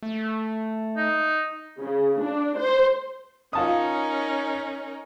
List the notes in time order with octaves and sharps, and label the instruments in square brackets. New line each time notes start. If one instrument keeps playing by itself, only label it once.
[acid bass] A3
[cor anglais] D#4
[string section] C#3
D4
C5
[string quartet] C#4 D#4 A#4 [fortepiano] F4 A5 D#6